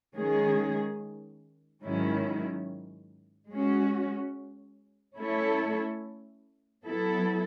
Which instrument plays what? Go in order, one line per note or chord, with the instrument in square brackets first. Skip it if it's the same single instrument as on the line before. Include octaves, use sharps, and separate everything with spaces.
[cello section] D#3 G#3 C#4 G#4
G#2 D#3 F#3 C#4 E4
G#3 C#4 F#4
A3 C#4 E4 A4 C#5
F#3 B3 E4 A4